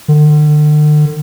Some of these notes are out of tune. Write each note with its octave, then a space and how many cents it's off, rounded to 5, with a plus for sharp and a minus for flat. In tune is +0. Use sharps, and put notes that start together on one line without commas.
D3 +40